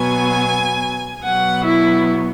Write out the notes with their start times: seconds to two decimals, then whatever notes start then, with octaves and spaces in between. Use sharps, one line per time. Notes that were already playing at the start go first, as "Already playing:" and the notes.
Already playing: B2 F#3 B3 G#5
1.23 B2 F#3 B3 F#5
1.65 E4